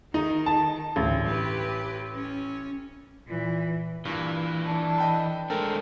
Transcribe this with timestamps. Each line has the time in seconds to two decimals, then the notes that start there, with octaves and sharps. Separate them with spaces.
0.14 D#3 D#4
0.46 A5
0.96 A1 D2 G2
1.27 G4 B4
2.15 C#4
3.27 A#2 E3
4.05 G2 A#2 E3
4.64 D4 A4
4.98 D#5 G5 B5
5.50 G#3 A3 D4 A4 A#4 C5 G5 G#5